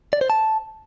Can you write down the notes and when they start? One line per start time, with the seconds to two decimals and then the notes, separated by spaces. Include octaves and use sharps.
0.13 D5
0.21 C5
0.30 A5